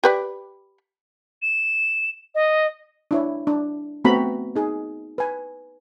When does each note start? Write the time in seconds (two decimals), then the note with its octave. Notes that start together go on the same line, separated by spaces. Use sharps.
0.04 G4 B4 D5
1.42 E7
2.35 D#5
3.11 D4 E4 C#5
3.47 D4
4.05 A3 B3 C4 F#4 A#5 B5
4.56 D#4 G#4
5.18 B4 G#5